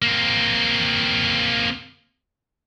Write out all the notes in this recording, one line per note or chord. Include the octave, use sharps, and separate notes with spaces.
A#3 C4